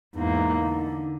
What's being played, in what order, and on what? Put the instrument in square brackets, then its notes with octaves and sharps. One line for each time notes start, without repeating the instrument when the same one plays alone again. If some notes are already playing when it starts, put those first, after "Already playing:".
[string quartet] E2 G#2 A#3 [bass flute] D#4
[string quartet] D3